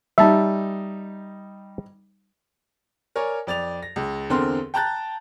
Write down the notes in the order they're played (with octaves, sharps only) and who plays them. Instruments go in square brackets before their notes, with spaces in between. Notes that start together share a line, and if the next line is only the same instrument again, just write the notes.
[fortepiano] G3 D#4 [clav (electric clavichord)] E5 A5
[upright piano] A#4 C#5 D5 G#5
F2 D5 A6 F7
A#6
C#2
E2 D3 C4 A#4 C6 F6
G5 A5 A#5 F#6 G6 A6